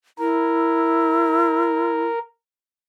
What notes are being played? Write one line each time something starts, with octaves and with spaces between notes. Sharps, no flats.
E4 A#4